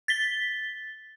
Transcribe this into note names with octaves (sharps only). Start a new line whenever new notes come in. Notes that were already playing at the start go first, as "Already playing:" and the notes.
A6 B6 G7